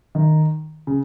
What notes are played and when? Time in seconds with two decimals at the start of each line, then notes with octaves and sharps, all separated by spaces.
0.15 D#3
0.87 C#3